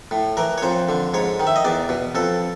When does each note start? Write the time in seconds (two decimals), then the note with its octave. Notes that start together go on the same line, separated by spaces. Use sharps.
0.11 A2
0.37 E3 A#4
0.58 C#5
0.62 F2 C5
0.89 D3
1.14 G#2 C#5
1.40 D#3
1.47 E5
1.56 D#5
1.65 E2 D5
1.89 B2
2.15 F2 A4